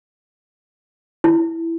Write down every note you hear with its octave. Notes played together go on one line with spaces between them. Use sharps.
E4